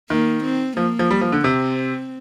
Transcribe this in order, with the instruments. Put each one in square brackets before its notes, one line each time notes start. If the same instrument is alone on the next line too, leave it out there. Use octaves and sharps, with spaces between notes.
[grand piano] D#3 [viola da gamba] A#3
[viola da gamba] C4
[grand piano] F3 [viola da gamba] A#3
[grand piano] F3
G3
F3
D3
[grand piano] C3 [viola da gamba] C4